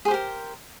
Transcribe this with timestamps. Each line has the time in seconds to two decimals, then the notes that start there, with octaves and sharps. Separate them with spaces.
0.05 G#4
0.08 C5
0.11 G4
0.14 A#4